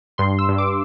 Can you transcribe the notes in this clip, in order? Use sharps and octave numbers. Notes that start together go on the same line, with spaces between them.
G2 C6
E6
G2
D6